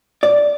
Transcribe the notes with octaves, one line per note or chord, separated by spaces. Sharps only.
D5